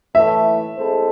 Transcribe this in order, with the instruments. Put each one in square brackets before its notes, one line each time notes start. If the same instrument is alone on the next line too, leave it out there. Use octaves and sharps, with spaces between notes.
[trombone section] A2 E3 A3 [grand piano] E5
[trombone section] G#3 C4 E4 A4 C5